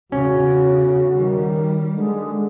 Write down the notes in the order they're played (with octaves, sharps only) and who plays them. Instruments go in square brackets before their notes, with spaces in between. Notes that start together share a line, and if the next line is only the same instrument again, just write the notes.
[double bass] E2 C#3 [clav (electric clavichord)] C#4 [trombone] F#4
[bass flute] D#3 [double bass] G3
[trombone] D3 [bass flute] G#3